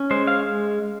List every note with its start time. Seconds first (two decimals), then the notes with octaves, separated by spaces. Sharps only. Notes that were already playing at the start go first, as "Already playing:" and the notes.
Already playing: C#4
0.11 G#3 C5
0.27 F5